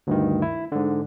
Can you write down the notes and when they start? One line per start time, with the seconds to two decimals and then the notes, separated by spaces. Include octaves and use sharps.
0.07 D2 G2 D#3
0.42 E4
0.72 G#2 D3